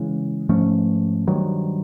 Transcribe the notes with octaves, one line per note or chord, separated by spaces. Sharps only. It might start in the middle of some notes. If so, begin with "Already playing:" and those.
Already playing: C#3 E3 G#3
G#2 F3 A3 C#4
G2 D#3 F#3